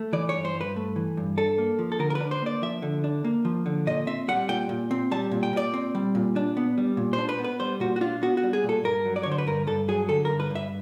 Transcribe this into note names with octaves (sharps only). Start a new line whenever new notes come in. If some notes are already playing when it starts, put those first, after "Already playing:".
Already playing: A3
E3 D5
C#5
G2
C5
G2
B4
A3
E3
G2
D4 A4
A#3
F3
A4
D3 A#4
A#4
B4
D4
C5
A#3 D5
F3 E5
D3
D4
A#3
F3
D3
A#2 D#5
C4 E5
G3 F#5
A#2 G5
A#2
C4
G3 A5
A#2
G5
A#2 D5
C4
G3
A#2
D4
B3
G3
A#2
C5
D4
B4
B3
B4
G3 C5
A#2 F#4
F#4
D4 F4
B3 F#4
F#4
G3
G#4
A#2
A4
G2 A#4
F#3
D5
D3 C#5
C5
B4
G2 A#4
G2 A4
F#3 G#4
D3 A4
G2 A#4
B4
G2
E5